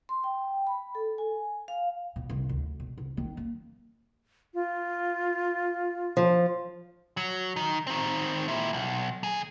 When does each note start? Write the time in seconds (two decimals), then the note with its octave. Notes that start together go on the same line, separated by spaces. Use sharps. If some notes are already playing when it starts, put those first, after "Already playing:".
0.09 C6
0.24 G5
0.67 B5
0.95 A4
1.18 G#5
1.68 F5
2.16 B2
2.29 C2
2.49 D2
2.80 B2
2.98 C2
3.17 D#3
3.37 A#3
4.54 F4
6.17 F3
7.17 F#3
7.56 D#3
7.87 D#3 C4
8.48 A#2 E4
8.73 B1
9.23 D#2 G#4